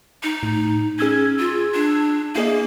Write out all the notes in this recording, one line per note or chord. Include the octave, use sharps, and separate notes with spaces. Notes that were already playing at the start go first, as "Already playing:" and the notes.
D#4
A2
C#4 G#4 E6 G#6
F4
D4
A#3 E4 G#4 D#5